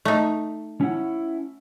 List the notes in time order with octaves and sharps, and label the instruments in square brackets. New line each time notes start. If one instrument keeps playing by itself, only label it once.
[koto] A3 D#4
[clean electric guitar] C#4 E4 F#5